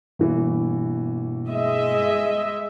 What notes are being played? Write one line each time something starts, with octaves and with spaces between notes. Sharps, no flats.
G1 G2 B2 E3 A#3
G#3 D#5 E5